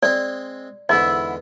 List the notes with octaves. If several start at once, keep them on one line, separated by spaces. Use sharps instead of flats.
G#3 C4 D5
E2 G#2 D3 E4 D#5